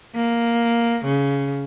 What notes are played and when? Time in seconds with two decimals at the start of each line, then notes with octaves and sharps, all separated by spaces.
0.16 A#3
1.05 C#3